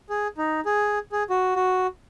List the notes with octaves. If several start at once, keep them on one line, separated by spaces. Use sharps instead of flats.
G#4
D#4
G#4
G#4
F#4
F#4